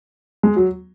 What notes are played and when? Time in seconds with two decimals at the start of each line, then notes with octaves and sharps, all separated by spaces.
0.43 G#3
0.56 F#3